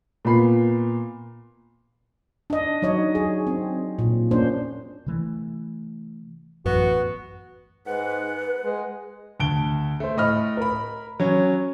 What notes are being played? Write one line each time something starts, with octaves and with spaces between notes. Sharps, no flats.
A#2 B3 B5 C7
D4 D#5
F#3 D#4 C#5 D#5
G#4
C4
A#2
A#3 C#4 D4 C5
C3 E3 A3
A1 F#2 B3 F#4
G#2 B4 F#5
G#3
D2 A5 D7 G7
A3 C5
A2 D#5 B5 F6
A#4 B5
F#3 C#4